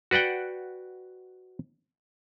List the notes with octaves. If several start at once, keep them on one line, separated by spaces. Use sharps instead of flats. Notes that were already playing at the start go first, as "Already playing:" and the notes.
F#4 B4 D5 F#5 G5